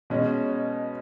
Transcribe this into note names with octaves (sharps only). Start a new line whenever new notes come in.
B2 G#3 C#4